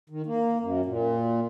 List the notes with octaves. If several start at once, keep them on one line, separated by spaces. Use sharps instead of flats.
D#3
A#3
F#2
A#2